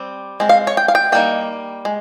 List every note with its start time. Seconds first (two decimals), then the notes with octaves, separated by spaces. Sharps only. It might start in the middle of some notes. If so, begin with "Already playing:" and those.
Already playing: G3 C4
0.40 G#3 C4
0.49 F5
0.67 C#5
0.77 G5
0.88 F5
0.95 G5
1.12 G3 A#3 D#4 G5
1.85 G#3